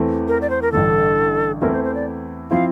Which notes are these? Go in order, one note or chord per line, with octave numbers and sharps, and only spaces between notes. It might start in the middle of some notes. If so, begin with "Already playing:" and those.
Already playing: E2 E3 A3 C4
A#4
D5
C5
A#4
A1 G2 D3 A4
E2 E3 A3 C4 E4 A#4
C5
C5
D5
F3 C4 E4 F5